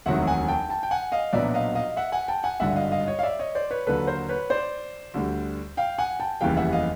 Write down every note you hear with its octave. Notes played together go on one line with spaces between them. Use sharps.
E1 D2 C3 D#3 F#3 E5 F#5
F#5 G#5
G5 A5
G5 A5
G5
F#5 G#5
D#5 F5
B1 A#2 F#3 B3 D4 D5 E5
D#5 F5
D#5 F5
E5 F#5
F#5 G#5
G5 A5
F#5 G#5
G#1 G2 D3 E5 F#5
D#5 F5
D#5 F5
C#5 D#5
F5
D5 E5
C#5 D#5
C5 D5
B4 C#5
D#2 D3 F#3 A4 B4
A#4 C5
B4 C#5
C5 D5
D2 D3 G3
F5 G5
F#5 G#5
G5 A5
F1 D#2 C#3 E3 G3 F5 G5
E5 F#5
D#5 F5